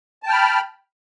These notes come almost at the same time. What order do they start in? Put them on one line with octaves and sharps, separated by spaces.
A5 G5 F6 B5